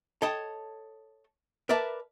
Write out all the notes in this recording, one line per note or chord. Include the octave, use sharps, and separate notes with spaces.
A4 C#5 D#5 G5 A5
A#4 B4 D5 E5 A5